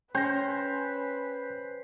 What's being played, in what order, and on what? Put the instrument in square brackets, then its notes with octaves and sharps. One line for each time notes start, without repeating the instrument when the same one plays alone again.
[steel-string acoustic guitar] C#4 [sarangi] B4 [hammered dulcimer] C5 [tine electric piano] G5 G#5 A#6